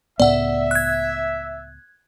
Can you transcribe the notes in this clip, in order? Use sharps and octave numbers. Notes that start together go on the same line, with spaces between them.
C#2 A2 B3 D5 E5 F#5
F#6 G#6